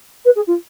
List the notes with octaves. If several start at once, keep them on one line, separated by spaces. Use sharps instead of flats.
B4
G#4
F4